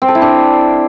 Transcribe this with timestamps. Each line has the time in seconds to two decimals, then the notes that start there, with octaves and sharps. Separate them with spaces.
0.02 C4
0.08 A4
0.15 E4
0.22 D4